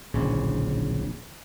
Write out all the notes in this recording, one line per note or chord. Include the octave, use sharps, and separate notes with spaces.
D1 A#1 C#3